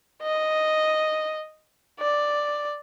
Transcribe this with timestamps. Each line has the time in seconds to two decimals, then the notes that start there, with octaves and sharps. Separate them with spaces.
0.22 D#5
2.00 D5